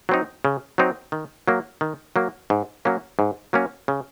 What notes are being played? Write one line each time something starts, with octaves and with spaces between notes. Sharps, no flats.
F#3 C4 D#4
C#3
F#3 C4 D#4
D#3
F#3 A#3
D#3
F#3 A#3
G#2
F#3 A#3 C#4
G#2
F#3 A#3 C#4
C#3